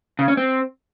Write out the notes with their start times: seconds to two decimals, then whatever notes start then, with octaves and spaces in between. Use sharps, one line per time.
0.19 C#3
0.28 C#4
0.37 C4